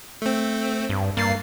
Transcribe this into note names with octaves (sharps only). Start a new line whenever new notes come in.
A3 C4
G2
G2 A#3 A6 C7